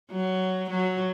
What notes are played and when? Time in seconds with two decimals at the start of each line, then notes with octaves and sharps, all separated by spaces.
0.11 F#3
0.70 F#3